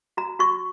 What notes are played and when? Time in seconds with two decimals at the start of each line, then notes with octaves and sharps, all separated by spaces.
0.17 F#4 A#5
0.39 F#4 C#6